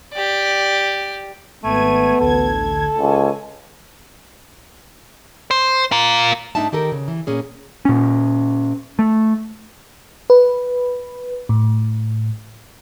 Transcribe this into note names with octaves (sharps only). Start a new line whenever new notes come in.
G4 D5
G#1 A3 B3 G#6 D#7
A1 D2 A4 G#6
C#2 G#5
C5
F4 A#4
G#2 A3 D4 D#4 E5 A5
D#3 G4 A4 A#4
C#3
E3
A#2 C#4 G#4
A#2 C#4
A3
B4
A2